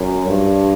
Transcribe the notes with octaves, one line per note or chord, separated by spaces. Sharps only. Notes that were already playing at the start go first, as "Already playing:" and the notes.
Already playing: F#2
G2